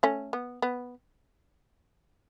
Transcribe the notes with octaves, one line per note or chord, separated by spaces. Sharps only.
A3 C#4
B3
B3